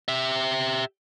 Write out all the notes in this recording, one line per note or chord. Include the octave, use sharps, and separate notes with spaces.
G4 E5